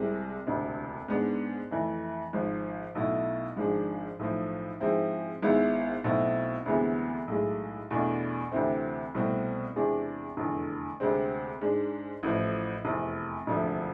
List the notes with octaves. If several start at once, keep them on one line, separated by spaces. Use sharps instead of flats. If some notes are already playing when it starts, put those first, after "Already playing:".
Already playing: C2 C3 G#3
E1 D2 C3
G#2 G#3 B3 D4
F2 E3 A3
G#1 G#2 F3
B1 B2 A3 E4
G#1 G#2 F3 G#3 D4
B1 A2 F3
G#2 F3 G#3 C4 E4
G#1 G#2 G#3 B3 E4
B1 B2 A3 C4 E4
D2 C3 E3 G#3 B3
B1 A2 G#3
E2 B2 A3 D4
D2 C3 E3 A3 C4
C2 B2 A3 C4
E2 C3 G#3 D4
F1 E2 D3
D2 C3 G#3 C4
G#2 G#3 D4
A1 A2 F3
F1 E2 C3
E1 D2 C3 F3 A3